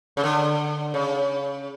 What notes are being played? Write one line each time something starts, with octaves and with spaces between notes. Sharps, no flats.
C#3
D3
C#3